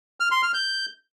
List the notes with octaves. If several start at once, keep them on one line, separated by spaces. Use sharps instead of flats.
F6
C6
F6
G6